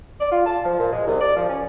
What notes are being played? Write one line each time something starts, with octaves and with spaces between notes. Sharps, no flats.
D5
F4
A5
F3
A#2
G#3
C2
D5
F3
C#4